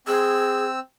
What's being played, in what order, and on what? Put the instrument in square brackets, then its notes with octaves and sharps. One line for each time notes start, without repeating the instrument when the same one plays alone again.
[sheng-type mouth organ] C4 E6 [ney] G#4